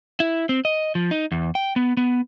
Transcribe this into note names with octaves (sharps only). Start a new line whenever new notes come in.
E4
C4
D#5
F3
D#4
E2
G5
B3
B3